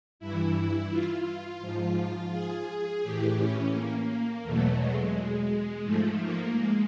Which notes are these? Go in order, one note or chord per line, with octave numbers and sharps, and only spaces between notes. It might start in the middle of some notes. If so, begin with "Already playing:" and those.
G2 E3 E4
F4
G#2 F3
G#4
A2 E3 G4
C#4
A#3
E2 B2 F#3 A3
G#3
G#2 F3 A3
A#3
G#3